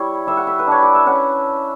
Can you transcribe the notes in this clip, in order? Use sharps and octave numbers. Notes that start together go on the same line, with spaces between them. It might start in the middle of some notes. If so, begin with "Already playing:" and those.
Already playing: G3 E4 C#5
G3 E5
F#5
E5
B4
D4 C#5
D5
E5
C#4 F#5